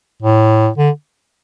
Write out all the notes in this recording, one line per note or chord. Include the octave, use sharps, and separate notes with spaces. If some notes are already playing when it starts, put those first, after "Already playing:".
A2
D3